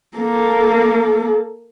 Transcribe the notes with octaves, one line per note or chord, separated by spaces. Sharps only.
A#3 A4